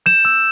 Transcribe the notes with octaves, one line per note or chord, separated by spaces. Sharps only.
G6 E7
E6